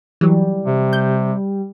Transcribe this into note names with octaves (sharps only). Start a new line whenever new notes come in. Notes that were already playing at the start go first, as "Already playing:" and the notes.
E3 F#3 G3
C3
G6